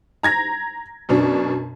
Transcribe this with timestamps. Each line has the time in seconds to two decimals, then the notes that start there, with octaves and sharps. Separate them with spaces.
0.23 A#5 G#6 A#6
1.09 F#2 B2 D4